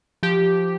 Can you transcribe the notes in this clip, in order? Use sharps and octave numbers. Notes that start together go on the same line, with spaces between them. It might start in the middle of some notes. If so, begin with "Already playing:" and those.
F3 G4